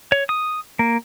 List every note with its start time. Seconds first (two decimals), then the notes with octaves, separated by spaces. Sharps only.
0.12 C#5
0.29 D#6
0.79 A#3